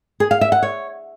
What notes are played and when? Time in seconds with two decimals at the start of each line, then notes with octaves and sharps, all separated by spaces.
0.20 G#4
0.31 F5
0.41 E5
0.52 F#5
0.62 C#5